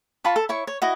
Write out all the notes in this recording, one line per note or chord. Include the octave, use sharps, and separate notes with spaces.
F4 A5 B5 C#6
A4
E4 C#5 C#6
C#5
E4 F#4 D#5